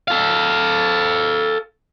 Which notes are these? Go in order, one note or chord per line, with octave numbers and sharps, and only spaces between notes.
A4 F5